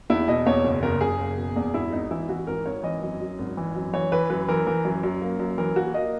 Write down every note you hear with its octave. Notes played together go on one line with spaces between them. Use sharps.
E2 E4
B2 D#5
E2 C#5
F#1
F#1 A#4
F#1 G#4
A#3
B2
E2
G#1 E4
G#1 D#4
E3 E4
E3 F#4
G#1 A#4
G#1 C#5
E3 D#5
F#2
F#2
G#1
E3
F#2
E3 C#5
E3 B4
F#2 B4
E3 A#4
E3 A#4
F#2
F#2
A#3
F#2
E3 A#4
A#3 F#4
A#3 D#5